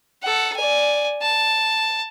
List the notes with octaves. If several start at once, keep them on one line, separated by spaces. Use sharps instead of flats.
A4 F#5
D5 G#5
A5